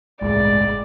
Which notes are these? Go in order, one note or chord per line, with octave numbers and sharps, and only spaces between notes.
G1 C2 A2 G#3 D5